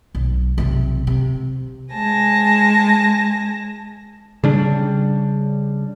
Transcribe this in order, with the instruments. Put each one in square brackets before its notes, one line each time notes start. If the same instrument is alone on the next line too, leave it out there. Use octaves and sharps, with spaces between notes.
[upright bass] B1
B1 C3
C3
[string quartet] G#3 G#5 A5 A#6
[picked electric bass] C#3 G3 D4